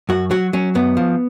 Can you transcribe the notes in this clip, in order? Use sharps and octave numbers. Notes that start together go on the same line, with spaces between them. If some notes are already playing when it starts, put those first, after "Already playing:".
F#2 F#4
F#3 F#4
F#3 C#4
F#2 B3
F3